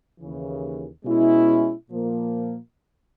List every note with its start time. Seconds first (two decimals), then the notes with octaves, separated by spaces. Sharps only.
0.19 D#2 C#3 E3
1.05 B2 G#3 C#4 E4
1.90 A#2 F3 A#3